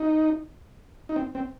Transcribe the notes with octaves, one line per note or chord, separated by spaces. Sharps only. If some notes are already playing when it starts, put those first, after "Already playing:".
Already playing: D#4
D#4
C4
C4